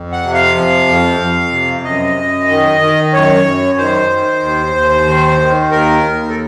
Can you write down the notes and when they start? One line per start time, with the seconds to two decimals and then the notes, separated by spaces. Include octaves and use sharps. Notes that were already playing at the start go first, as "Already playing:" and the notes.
Already playing: F2
0.12 F#5
0.23 C3
0.34 F5
0.55 F3
0.88 F2
1.20 F2
1.52 C3
1.84 F#2 D#5
2.16 F#2
2.49 D#3
2.81 D#3
3.13 F#2 C#5
3.45 F#2
3.78 D#3 C5
4.10 D#3
4.42 D#2
4.75 D#2
5.07 D#3
5.39 D#3
5.72 D#2 A#4
6.04 D#2
6.29 A4